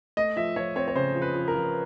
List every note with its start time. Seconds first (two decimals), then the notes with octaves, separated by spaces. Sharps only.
0.17 A3 D#5
0.36 F3 E5
0.56 F3 C#5
0.76 C4 C#5
0.88 C#5
0.95 C#3 C5
1.15 F3
1.22 B4
1.34 F3
1.48 A#4
1.54 F3